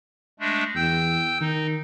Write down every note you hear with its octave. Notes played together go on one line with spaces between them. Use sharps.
G#3 A3 D4
E2 G5 E6 G6
D#3 D#4